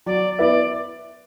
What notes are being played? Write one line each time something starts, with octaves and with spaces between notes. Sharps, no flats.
F#3 D5
B3 E4 B4 D5 E5